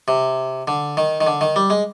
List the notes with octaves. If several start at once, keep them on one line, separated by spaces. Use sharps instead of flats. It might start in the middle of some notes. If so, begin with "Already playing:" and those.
C3
D3
D#3
D#3
D3
D#3
G3
G#3